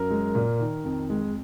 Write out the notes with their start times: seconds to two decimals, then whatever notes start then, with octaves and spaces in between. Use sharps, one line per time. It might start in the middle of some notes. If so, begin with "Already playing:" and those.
Already playing: F#2 A#4
0.10 G#3
0.35 A#2
0.60 D#3
0.84 F2
1.10 G#3